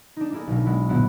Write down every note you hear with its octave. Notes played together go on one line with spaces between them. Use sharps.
D4 D#4
A#3 D4 E4 G#4 A#4
B1 B2
G#3 B3 E4
G1 A#2 B3 E4 F#4